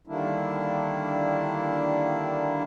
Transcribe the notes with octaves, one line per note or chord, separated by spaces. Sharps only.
D3 D#3 G3 A#3 D4 E4